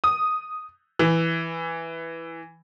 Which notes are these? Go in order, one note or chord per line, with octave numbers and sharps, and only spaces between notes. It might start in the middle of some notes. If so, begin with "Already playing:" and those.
D#6
E3